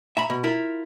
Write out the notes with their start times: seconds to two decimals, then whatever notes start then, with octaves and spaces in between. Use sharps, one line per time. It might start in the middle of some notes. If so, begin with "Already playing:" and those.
0.17 E5 A#5 B5
0.30 B2
0.44 E4 F4 A#4